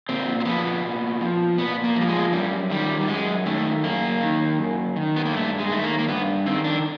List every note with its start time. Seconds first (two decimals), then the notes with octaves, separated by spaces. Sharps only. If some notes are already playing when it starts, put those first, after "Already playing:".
0.09 A#2 C4
0.40 C4
0.45 F3 B3
0.84 A#2
1.21 F3
1.58 A#2 B3
1.84 A#3
1.96 F3
2.01 G3
2.08 G#3
2.33 F#2 G3
2.70 D#3 G3
3.01 G3
3.08 F#2 G#3
3.46 D#3 A3
3.84 F#2 A#3
4.21 D#3
4.58 F#2
4.96 D#3
5.16 B3
5.26 A#3
5.33 G2 A3
5.59 G#3
5.70 D#3 A3
5.84 A#3
5.99 A#3
6.08 G2 B3
6.45 D#3 C4
6.64 D4